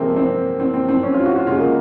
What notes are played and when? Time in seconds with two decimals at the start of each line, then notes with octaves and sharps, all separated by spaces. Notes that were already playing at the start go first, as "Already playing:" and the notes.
Already playing: C3 F3 G#3 A#3 C4
0.16 C4
0.60 C4
0.74 C4
0.89 C4
1.03 C#4
1.14 F4
1.25 F#4
1.36 F4
1.47 C#3 G#3 F4
1.59 A#3